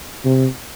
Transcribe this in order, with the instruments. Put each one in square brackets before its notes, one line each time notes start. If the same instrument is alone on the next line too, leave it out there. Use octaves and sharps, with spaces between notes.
[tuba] C3